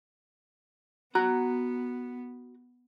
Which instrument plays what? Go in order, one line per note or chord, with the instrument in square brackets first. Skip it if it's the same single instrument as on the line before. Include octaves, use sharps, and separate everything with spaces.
[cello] B3 [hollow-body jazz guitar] F#4 A#5